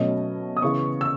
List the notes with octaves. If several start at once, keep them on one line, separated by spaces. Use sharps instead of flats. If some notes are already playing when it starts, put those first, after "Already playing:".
Already playing: B2 F#3 A3 C#4 D#5
D#6
C#3 E3 B3 C#6
E6